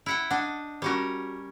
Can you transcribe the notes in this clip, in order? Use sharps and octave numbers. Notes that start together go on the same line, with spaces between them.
E4 F#5 G5
D4 D#5 F#5
G3 C#4 F#4 A#4 C#5